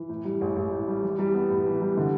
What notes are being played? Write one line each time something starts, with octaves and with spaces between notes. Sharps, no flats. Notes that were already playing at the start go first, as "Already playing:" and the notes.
Already playing: E3
A2
G3
A1
A1
A2
G3
E3
G3
B3
A2
E3
G3
D3